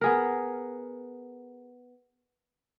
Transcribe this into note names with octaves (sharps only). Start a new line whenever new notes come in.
B3 G#4 A#4